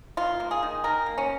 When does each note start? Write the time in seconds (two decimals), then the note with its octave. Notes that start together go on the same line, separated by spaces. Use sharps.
0.17 A#3 F4
0.40 A#3
0.51 G#4
0.63 D#3
0.84 D#3 A#4
1.06 A#3
1.18 C#4